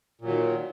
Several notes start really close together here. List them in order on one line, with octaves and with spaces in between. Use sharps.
A#2 F#3 D#3